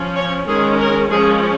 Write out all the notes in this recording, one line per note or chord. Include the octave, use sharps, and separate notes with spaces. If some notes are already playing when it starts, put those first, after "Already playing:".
Already playing: F3 C#4
C#5
D#3 G#3 C#4 G#4
A#4
F3 G#3 C#4 G#4